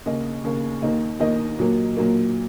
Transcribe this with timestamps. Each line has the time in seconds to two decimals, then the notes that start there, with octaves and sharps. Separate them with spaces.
0.06 D#2 C#3 A#3 D#5
0.44 D#2 C#3 A#3
0.82 D#2 D#3 A#3 D#5
1.19 D#2 D#3 A#3 D#5
1.59 A#2 F#3 A#3
1.97 A#2 F#3 A#3